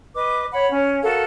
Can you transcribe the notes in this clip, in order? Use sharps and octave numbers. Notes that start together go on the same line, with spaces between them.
B4 D#5 D6
C#5 F#5 B5
C#4
F#4 A4 A#4 F5